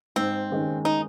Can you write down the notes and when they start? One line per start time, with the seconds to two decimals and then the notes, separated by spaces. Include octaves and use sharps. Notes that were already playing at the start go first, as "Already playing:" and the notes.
0.16 G#2 C4
0.50 D#3 G#3 C#4
0.85 D#4